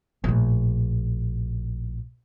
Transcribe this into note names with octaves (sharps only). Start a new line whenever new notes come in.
A#1 A2